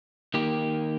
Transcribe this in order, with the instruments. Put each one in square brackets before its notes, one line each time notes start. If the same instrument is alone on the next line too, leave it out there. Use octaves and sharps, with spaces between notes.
[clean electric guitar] D#3 A#3 G4